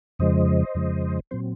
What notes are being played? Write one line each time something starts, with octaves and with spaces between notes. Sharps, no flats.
F2 C#3 F3 G#3 C5 D#5
F2 C#3 F3 G#3
A#2 F#3 C4 C5